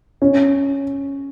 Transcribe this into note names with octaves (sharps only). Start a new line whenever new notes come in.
C#4